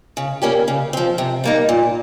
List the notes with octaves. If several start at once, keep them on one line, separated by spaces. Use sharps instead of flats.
C#3
G3 A#3 C#4 G4
C#3
F3 C4
C3
G3 A#3 D#4
A#2